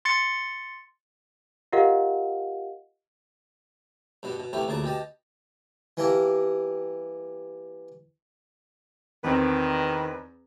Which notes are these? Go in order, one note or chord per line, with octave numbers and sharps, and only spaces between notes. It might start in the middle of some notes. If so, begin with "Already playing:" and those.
C6 A6 C#7
F4 G4 A#4 D#5 F5 F#5
G2 B2 B3
B2
C3 E3 A3 B3 G4
A1 D2 A#2 G#4 A5 D6
B2 G4 D#5 A5
E3 G3 A#3 G4 A4 A#4
E2 D#3 C4 B4